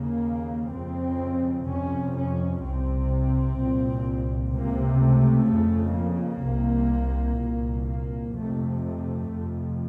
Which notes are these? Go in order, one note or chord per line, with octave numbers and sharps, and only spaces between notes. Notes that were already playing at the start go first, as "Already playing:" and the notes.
Already playing: D#2 C#3 A#3
F2 C#3 C4
F2 C3 C#4
C#4
C2 C3 C4
C2 A#2
C#2 C3 A#3
A3
F2 C#3
A#3
C2 C3
C2 A#2
A#3
F2 C3 A3
A3
F2 C3